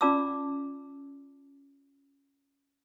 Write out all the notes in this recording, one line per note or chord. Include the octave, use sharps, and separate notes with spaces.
C#4 F4 D5 A5 D6 E6